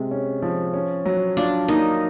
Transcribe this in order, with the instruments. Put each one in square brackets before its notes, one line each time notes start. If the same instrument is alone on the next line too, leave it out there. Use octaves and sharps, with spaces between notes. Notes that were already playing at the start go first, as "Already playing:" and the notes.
Already playing: [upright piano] C3 G#3
C#4
F3
C#4
F#3
[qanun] D4 [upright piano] F4
[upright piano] A#3 [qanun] D#4